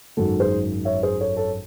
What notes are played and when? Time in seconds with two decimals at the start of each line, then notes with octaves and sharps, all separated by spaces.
0.17 G#1 F#2 D#3 G#3 F#4 A4
0.40 G#4 C5
0.85 C#5 E5
1.03 G#4 C5
1.20 A4 C#5
1.37 A4 C#5